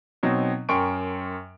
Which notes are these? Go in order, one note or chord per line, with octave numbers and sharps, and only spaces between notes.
B2 F#3 C4 D#4
F#2 A#4 G5 C6 C#6 D7